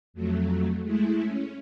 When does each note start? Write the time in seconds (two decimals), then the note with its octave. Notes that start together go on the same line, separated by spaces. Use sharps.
0.14 F2 F#3 A3
0.82 G#3 A3 E4
1.21 C#4